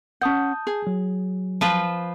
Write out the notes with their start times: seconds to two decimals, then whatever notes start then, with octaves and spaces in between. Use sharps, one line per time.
0.21 C#4 F#5 A5 D#6 G6
0.67 G#4
0.87 F#3
1.61 F3 F4 B4